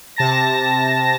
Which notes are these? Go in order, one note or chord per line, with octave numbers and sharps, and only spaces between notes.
C3 A5 A#6